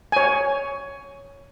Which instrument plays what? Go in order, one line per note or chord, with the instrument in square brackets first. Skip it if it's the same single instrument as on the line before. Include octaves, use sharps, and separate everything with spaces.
[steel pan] C#5 G#5